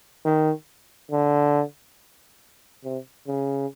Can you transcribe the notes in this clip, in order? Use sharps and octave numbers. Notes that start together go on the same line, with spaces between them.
D#3
D3
C3
C#3